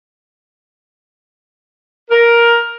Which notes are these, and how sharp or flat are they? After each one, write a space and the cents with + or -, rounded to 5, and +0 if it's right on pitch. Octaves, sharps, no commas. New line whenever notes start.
A#4 +10